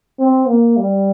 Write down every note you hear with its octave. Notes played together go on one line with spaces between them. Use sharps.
C4
A#3
G3